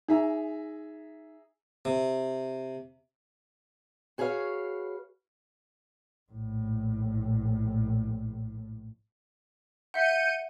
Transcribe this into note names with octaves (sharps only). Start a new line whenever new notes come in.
D#4 G#4 E5 A#5
C3
F#4 G#4 B4 C#5 F5
A#1 A2
E5 F#5 G6 C#7 D#7